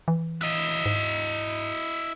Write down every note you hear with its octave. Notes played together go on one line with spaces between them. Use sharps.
E3
E4 D#5
G#2